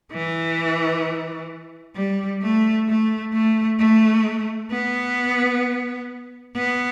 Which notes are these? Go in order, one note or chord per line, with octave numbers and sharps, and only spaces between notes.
E3
G3
A3
A3
A3
A3
B3
B3